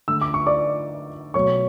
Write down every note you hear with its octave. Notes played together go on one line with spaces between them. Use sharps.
D3 A3 E6
D6
C#6
D5 D6
B2 F#3 A3 C#5 C#6